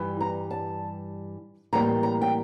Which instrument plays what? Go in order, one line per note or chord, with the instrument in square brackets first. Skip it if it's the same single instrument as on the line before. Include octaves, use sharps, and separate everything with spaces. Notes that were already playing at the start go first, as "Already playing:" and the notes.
Already playing: [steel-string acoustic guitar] G2 E3 G3
A#5
A5
A2 E3 G3 A#3 A#5
A#5
G5